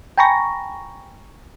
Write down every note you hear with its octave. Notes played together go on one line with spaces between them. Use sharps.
G5 G#5 A#5 B5 C#6 A#6